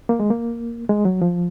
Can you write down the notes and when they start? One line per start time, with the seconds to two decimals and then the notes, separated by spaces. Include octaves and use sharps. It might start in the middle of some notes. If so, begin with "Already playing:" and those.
0.09 A#3
0.20 G#3
0.30 A#3
0.89 G#3
1.05 F#3
1.22 F3